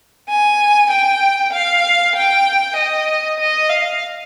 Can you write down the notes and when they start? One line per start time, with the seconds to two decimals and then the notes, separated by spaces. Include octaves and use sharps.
0.29 G#5
0.91 G5
1.53 F5
2.15 G5
2.77 D#5
3.39 D#5
3.70 F5